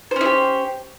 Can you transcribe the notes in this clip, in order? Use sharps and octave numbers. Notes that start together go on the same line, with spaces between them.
C#4 E4 G4 C5